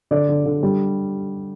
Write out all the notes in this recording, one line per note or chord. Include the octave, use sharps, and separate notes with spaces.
D3 D5
D3
D3
G3